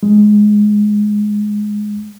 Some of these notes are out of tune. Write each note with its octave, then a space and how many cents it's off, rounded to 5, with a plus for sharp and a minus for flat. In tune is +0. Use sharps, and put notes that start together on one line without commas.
G#3 +10